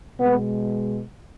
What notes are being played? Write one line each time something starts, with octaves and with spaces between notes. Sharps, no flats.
B2 G#3 B3